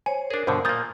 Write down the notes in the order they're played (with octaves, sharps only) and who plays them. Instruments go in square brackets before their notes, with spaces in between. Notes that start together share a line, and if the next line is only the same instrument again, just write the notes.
[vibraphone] C5 C#5 [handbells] G#5
[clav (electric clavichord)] D4 G#4 [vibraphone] A#4
[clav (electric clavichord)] G2 B2 D3 [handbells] C5
[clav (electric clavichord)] A#2 A#3 [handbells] D#6 G6 A6